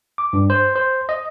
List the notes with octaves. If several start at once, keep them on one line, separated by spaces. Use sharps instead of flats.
D6
G2
C5
C5
D#5